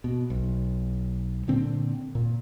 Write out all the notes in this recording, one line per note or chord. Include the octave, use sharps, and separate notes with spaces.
B2
B1
A#2 D3 C4
A#2